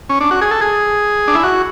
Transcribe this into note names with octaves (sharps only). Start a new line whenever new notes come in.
C#4
D4
F#4
G#4
A4
G#4
D4
E4
F#4